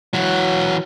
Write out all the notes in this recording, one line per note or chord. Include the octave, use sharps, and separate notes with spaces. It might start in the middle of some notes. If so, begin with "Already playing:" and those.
E3 F#3 F#4